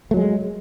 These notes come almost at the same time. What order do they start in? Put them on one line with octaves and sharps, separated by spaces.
A3 F#3 G#3